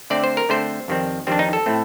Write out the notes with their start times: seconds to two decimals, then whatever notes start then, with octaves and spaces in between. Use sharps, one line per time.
0.10 D3 A3 C4 D5
0.24 C5
0.37 A#4
0.49 D3 A3 C4 C5
0.88 F2 D#3 G3 C4
1.27 F2 D#3 G3 C4 D4
1.39 D#4
1.53 A4
1.66 A2 A3 C4